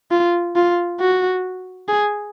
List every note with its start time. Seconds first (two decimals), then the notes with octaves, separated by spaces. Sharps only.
0.11 F4
0.56 F4
1.00 F#4
1.88 G#4